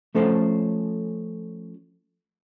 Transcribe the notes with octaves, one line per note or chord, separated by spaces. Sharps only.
F3 A3 C#4 A4 C5